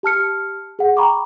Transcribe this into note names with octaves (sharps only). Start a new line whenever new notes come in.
G4 A5 F6 C#7
G#4 F#5
G5 A#5 B5 C#6 D6